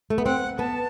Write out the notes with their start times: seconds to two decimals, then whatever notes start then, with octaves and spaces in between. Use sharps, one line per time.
0.10 A3
0.18 B3
0.26 C4 F#5
0.58 B3 A5